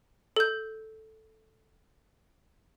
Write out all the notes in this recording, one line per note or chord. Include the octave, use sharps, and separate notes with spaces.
A4 G6